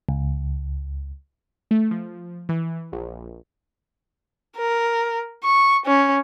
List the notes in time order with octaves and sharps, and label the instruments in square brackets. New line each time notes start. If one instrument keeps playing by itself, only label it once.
[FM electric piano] C#2
[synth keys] A3
F3
E3
A#1
[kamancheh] A#4
C#6
C#4